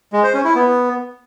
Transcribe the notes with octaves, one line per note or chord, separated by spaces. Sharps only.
G#3
C5
C#4
E4
B3